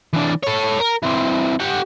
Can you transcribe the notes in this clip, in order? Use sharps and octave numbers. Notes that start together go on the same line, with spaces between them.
E3 D4
A4 C#5
A#4
E3 C4
G4 F#5